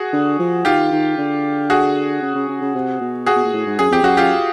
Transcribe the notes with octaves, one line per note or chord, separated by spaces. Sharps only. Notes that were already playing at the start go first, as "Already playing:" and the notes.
Already playing: F#4 G#4
D3
F3
D#3 F4 G4
D#3
D3
F#4 G#4
C#3
C#3
C#3
C#3
C3
B2
F#4 G#4
B2
A#2
A2
G#2
F#2 G#4
F2 G4
F#2 F#4
F4 G4